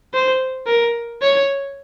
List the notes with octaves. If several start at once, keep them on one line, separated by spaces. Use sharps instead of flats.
C5
A#4
C#5